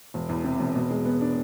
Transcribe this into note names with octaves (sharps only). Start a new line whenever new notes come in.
E1
E2
C3
E1
B2
G#3
B3
D4